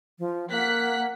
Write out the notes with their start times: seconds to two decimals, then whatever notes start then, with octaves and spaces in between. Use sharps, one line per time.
0.19 F3
0.50 A#3 F#5 F#6 B6